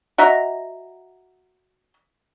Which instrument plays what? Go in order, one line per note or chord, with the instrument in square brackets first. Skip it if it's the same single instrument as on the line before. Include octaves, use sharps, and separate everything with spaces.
[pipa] F#4 D#5 E5 A#5